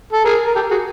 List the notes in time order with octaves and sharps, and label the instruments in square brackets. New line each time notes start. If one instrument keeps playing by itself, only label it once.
[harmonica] A4
G#4 A#4
A#4
G4 A4
F#4 G#4